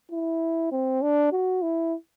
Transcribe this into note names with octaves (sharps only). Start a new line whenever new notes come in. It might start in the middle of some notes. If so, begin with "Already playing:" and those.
E4
C4
D4
F#4
E4